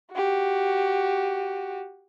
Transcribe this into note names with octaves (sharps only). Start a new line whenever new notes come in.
F#4 G4